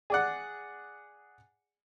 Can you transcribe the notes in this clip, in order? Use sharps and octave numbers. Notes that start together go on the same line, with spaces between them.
G#4 D5 F#5